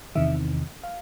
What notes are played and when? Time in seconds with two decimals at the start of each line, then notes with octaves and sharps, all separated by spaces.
0.15 E2 C3 D#3 E5
0.84 F5